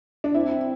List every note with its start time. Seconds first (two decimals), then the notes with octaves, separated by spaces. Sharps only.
0.24 D4
0.34 C4 E4